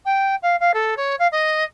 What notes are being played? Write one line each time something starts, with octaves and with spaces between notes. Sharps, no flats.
G5
F5
F5
A4
C#5
F5
D#5